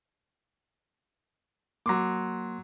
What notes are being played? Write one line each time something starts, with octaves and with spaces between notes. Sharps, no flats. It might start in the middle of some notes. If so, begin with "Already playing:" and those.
F#3 A#3 C6 D6